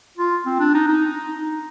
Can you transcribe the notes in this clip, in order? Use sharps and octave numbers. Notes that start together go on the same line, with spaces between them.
F4
C4
D4
D#4
D#4